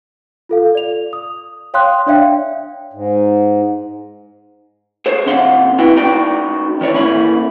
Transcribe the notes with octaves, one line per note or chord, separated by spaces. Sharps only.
F4 A4 F5
D5 F7
D#6
C#5 F5 G5 C6 D#6 F#6
D4 C#5 D5 E5 F5 G5
G#2
G#4 C5 C#5
F2 C3 C#4 F5 F#5 C6
B3 E4 F#4 G5
C#4 D#4 F#4 D5 G5
D#3 E3 C#5 D5
A#2 C#4 E4 B5